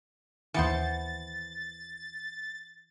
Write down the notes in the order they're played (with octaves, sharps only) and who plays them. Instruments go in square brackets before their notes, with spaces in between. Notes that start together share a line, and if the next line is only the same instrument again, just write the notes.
[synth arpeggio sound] D#2 C#7 [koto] E3 B3 C5 [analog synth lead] A6